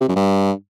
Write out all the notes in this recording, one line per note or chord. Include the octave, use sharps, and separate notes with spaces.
C3
F#2
G2